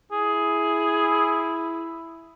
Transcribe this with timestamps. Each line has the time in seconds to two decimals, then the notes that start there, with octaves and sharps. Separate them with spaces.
0.12 E4 G#4